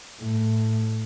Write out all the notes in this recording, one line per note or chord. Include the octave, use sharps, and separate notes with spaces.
A2